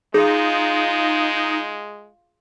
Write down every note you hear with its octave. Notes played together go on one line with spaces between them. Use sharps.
G#3 D#4 F4 G#4